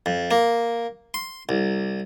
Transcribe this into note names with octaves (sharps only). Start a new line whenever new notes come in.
F2
A#3
C6
C2